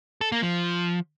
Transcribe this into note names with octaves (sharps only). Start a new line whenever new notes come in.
A4
A#3
F3